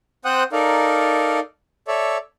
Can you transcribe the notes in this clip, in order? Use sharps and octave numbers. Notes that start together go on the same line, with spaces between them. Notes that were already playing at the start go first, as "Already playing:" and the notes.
C4 C5 F#5 G5 D#6 F#6
D#4 A4 A#4 D5 F5
A4 C#5 D5 E5